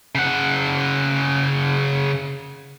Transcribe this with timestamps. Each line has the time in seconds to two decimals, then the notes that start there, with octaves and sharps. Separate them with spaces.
0.15 C#3 F#5